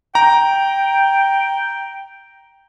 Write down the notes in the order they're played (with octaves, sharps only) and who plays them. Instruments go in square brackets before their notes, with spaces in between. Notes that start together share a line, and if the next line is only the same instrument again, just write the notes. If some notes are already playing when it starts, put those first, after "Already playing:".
[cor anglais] G5 [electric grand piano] A#5